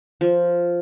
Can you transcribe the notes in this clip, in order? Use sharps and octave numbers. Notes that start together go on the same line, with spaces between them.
F3